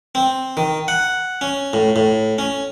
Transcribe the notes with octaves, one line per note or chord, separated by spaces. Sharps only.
C4
D#3
F#5
C#4
A2
A2
C#4